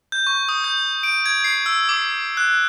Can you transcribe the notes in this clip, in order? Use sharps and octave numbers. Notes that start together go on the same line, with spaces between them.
G6
C#6
D#6
G6
D7
G#6
C7
E6
D6
F#6